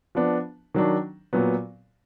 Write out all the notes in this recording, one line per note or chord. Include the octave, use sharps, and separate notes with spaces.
F3 B3 D4
D#3 F#3 D4
A#2 F#3 B3